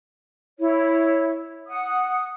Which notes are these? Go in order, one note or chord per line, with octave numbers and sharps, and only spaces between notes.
E4 C#5
F#5 D#6